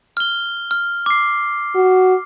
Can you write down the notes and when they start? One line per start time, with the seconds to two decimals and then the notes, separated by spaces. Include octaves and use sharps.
0.17 F6 G7
0.71 F6
1.06 D6 C7
1.76 F#4